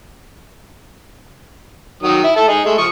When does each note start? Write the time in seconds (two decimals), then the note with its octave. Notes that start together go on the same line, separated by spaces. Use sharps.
2.03 D#3 F#3 D#6
2.23 E4
2.36 E4 A4 A5
2.48 D#4 G#4 D#5
2.65 G#3 A3
2.78 F3 C#6 D#6